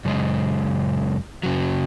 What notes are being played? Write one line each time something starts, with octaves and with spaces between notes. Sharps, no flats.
F#2 C#3 G#3
F#2 C#3 F#3